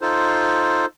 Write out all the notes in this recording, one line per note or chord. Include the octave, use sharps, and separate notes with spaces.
D#4 F4 A4 C5